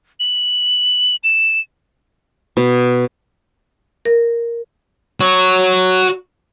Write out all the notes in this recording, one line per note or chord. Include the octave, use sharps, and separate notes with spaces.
F#7
E7
B2
A#4
F#4 C#5